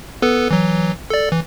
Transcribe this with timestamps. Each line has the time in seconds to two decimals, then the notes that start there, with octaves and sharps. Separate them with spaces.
0.22 B3 A4 B4
0.51 E3 F#3
1.10 A4 D5
1.32 E3